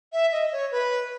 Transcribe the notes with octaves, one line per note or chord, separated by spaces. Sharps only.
E5
D#5
C#5
B4